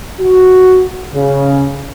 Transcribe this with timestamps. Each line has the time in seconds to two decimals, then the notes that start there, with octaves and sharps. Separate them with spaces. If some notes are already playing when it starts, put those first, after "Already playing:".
0.20 F#4
1.14 C#3